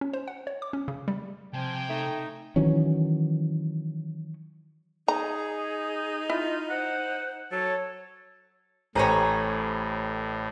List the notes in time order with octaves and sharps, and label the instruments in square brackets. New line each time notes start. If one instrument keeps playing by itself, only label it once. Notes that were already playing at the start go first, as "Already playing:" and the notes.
[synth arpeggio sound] C#4
C5
F#5
C#5
D6
C#4
C#3
G3
[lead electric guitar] C3 [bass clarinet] F3 [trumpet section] G5 G#5
[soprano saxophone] A3 [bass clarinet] D#4
[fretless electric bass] D#3 E3 F#3 C#4
[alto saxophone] D#4 [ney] G#4 [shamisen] A#5
[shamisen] E4 [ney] F4
[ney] C5 [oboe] F#5
[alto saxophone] F#3 [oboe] A4 [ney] C#5
[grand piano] A1 [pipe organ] A2 [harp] G4 C5 [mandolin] C#5 G#5 A#5